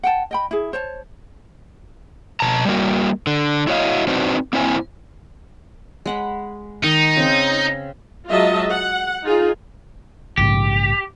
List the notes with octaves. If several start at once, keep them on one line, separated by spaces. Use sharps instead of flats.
F#5 G5 A5
D#5 G5 B5
E4 G#4
C5 C#5 A5
B2 A5 A#5
G3 A#3 F#4
D3
E4 F#4 C#5 D#5 F5
C4 D4 D#4 F#4 B4 C5
A#3 C4 E4 C5 G#5
G#3 F#5 B5
D#3 D#4
C#3 C4
F#3 G#3 F4 D#5 E5 A5
F#5
D#4 F4 G#4
A#1 G#2 C#3 G4